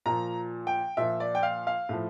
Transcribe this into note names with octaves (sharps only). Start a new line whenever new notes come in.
A#2 F3 A#5
G5
A#2 F3 E5
D5
G5
F5
F5
A2 F3